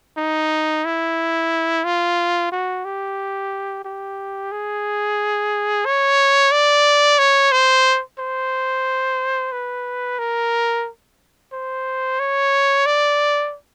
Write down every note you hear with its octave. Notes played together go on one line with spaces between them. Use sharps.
D#4
E4
F4
F#4
G4
G4
G#4
C#5
D5
C#5
C5
C5
B4
A#4
C5
C#5
D5